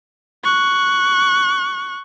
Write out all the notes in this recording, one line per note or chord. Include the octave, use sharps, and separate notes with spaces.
C#6 F#6